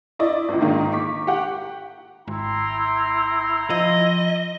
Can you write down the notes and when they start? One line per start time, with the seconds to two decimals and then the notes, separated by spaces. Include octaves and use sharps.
0.19 E4 D5 D#5
0.49 G1 C#2
0.61 G#2 D#3 A#3 D#4
0.92 C#6 D6 B6
1.27 G4 F#5
2.28 G#1 E4 G5 A#5 C6
3.70 F3 D#5